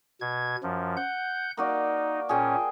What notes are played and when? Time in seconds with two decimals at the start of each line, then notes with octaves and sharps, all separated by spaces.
0.21 B2 G#6
0.63 F#2 F3
0.96 F#5 G6
1.57 A#3 D#4 F#4 D5
2.29 A#2 C#4 G#4 G5